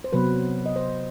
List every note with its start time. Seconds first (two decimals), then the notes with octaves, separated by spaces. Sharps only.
0.04 C5
0.13 C3 F#3 B3 B4
0.66 D#5
0.76 C5